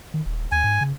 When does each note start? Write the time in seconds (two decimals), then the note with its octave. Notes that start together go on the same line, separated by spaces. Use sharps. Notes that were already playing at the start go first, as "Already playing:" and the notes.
0.14 D#3
0.26 D#1
0.52 D#2 G#5
0.64 G#2
0.81 C#3